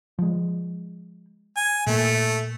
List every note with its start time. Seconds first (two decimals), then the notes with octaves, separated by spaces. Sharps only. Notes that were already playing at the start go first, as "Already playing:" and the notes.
0.19 F3 G#3
1.57 G#5
1.87 A#2 A3 A#3